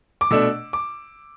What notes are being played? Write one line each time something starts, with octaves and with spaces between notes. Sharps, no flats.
D6
B2 A3 D4 E6
D6